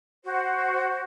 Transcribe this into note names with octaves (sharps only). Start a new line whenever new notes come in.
F#4 C5